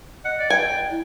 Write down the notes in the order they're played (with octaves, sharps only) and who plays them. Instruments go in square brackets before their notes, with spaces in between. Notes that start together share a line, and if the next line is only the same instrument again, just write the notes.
[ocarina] D#5 [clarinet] F#5
[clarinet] D5
[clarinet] G5 [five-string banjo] G#5
[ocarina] E4